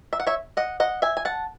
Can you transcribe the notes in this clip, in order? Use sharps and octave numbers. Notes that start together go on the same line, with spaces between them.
E5
F#5
C#5 E5
D#5 F#5
D#5 F#5
E5 G#5
G#5
F#5 A5